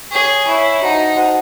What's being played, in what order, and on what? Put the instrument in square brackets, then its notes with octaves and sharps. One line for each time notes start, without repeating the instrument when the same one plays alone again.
[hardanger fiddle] G#4 [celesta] C#5 G#5 C#6
[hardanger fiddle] E4 [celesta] C#5 G#5 C#6
[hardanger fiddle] D#4 [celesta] F#4 C5 F#5 A5
[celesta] F#4 C5 F#5 A5